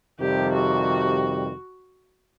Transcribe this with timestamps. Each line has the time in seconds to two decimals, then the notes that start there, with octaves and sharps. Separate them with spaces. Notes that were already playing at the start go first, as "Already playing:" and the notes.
0.19 F2 C3 D#3 G3 G4
0.53 F#4